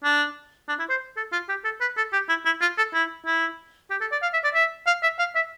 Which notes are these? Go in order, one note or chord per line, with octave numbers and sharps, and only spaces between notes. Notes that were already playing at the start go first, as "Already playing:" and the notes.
D4
D4
E4
C5
A4
F4
G4
A4
B4
A4
G4
E4
E4
F4
A4
E4
E4
G4
A4
D5
F5
E5
D5
E5
F5
E5
F5
E5